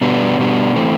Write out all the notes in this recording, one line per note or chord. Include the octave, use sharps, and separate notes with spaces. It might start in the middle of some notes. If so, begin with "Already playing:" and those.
B2 G3 B3 D4
B2 G3 B3 D4
E3 A3 C4